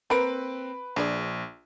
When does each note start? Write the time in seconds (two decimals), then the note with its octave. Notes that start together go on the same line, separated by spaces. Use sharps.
0.10 A#3 C4 A#4 B4 D7
0.96 A#1 D4 G#4 D5